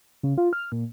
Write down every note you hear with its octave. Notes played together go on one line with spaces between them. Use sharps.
C#3
F4
F6
A#2